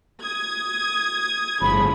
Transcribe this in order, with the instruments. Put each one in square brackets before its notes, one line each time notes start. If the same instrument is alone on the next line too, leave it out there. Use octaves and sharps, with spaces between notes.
[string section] D#6 G#6
[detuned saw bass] G1 [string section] A2 C#3 F3 [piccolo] B5